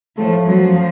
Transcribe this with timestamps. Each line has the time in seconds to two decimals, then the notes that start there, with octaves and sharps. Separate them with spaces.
0.17 A2 F3 A3
0.47 F#2 F3 F#3